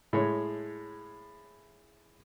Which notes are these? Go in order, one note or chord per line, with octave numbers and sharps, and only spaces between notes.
A2 G#3 C#5